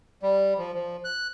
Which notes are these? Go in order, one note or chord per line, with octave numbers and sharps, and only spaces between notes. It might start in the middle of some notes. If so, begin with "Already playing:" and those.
G3
F3
F3
F#6